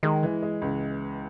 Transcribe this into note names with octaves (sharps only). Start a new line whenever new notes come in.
D#3 G#3
E3
G#3
C#2